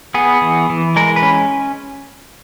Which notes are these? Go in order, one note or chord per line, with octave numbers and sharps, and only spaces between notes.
B3 G#4
E3
E3
G#3 A#4
B4
C#4